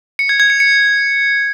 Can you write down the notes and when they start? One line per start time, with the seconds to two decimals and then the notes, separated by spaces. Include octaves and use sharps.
0.19 C#7
0.29 G#6
0.40 G#6
0.50 C#7
0.60 C#7